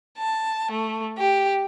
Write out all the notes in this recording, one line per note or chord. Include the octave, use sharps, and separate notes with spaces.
A5
A3
G4